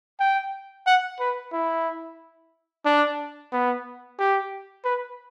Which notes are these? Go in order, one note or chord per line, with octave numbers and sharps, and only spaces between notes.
G5
F#5
B4
E4
D4
B3
G4
B4